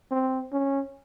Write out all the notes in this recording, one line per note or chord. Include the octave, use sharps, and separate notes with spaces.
C4
C#4